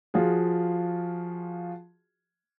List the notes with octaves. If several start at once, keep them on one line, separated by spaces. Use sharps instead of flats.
F3 F4 F#4 G#4